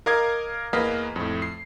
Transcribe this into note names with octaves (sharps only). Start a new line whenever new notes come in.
A#4 D#5 F5 D6 G#6
E2 A#3 B4 D#5 F5 B6
F2 A2
C7